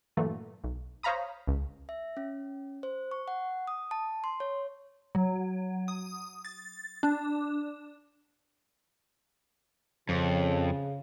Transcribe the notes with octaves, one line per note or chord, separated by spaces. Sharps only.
G2 A#2 E3 F#3 A3
B1
C5 C#5 F5 A#5 B5 D#6
C#2
E5
C#4
C5
C#6
F#5
D#6
A5
C6
C#5
F#3
D#6
A6
D4
F2 C#3